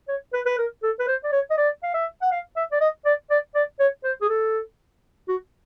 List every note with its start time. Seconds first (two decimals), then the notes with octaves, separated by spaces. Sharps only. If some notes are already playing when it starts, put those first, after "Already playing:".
0.08 C#5
0.33 B4
0.46 B4
0.58 A#4
0.83 A4
0.99 B4
1.08 C5
1.24 D5
1.32 C#5
1.50 D#5
1.57 D5
1.83 F5
1.94 E5
2.22 F#5
2.32 F5
2.56 E5
2.72 D5
2.81 D#5
3.05 D5
3.30 D5
3.55 D5
3.80 C#5
4.04 C5
4.21 G#4
4.29 A4
5.28 F#4